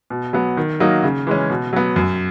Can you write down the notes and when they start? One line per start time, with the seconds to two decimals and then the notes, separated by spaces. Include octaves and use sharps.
0.10 B2
0.33 F#3 B3
0.57 D#3
0.80 F#3 A#3 D#4
1.03 C#3
1.27 E3 G#3 C#4
1.50 B2
1.73 F#3 B3
1.96 F#2